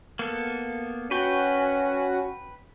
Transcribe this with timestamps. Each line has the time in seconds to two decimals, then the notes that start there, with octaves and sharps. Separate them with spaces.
0.19 A#3 B3 A4
1.11 C#4 F#4 B4 G5